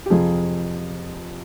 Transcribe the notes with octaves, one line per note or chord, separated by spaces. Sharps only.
G4
F2 C3 F3 G#4